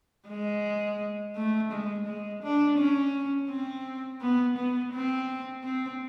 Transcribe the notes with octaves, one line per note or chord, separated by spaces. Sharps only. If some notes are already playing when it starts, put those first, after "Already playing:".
G#3
A3
G#3
G#3
D4
C#4
C4
B3
B3
C4
C4